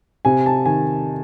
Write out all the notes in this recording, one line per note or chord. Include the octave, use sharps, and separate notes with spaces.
C3 G#5
A5
D#3 G#5